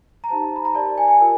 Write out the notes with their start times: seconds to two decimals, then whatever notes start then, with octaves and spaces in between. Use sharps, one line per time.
0.24 A#5
0.29 D#4 G4 C5 A5
0.56 B5
0.65 A#5
0.75 G4 A#4 D5 A5
0.98 G#5
1.08 G#5
1.21 F4 A#4